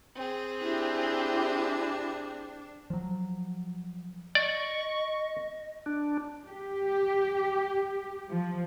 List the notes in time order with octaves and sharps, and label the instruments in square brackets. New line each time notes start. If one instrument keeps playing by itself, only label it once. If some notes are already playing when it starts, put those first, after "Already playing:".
[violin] C4 G#4
[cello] D4 [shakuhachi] E4 [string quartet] G4
[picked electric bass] F3 F#3
[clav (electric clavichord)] D5 [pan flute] D#5 [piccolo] C#6
[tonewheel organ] D4
[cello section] G4
F3